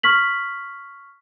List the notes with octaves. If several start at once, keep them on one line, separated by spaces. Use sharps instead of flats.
C#6 F6 B6 F#7